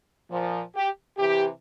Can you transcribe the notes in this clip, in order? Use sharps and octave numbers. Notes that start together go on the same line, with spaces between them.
A#2 F3
G4
C3 E3 G4